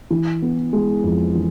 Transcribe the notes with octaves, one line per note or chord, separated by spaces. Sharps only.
E3
B3
G#3
F2
E3